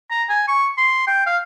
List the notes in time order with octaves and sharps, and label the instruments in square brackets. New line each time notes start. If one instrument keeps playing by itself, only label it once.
[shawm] A#5
G#5
C#6
C6
G5
F5